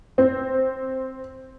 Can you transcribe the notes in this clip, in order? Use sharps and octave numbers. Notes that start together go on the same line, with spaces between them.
C4